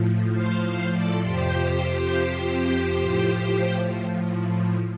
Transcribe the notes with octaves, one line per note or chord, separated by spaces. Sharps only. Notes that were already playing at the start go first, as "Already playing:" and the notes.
Already playing: A2 F3
C5 F5
C5 F5
A4 D5
F2 C3 F3 G4 C5
A2 F3